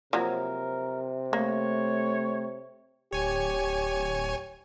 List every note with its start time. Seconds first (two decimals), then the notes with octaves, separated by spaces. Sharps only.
0.13 C3 F3 F#3 A#3 A#4
1.33 A3 A#3 C#5
3.13 D1 G4 C#5 G#5